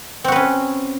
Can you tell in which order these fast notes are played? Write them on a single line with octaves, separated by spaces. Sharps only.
C4 F#4 B4 C#4